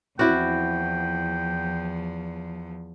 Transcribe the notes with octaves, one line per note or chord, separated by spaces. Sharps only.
E2 F3 C4 E4 F#4 D5 G5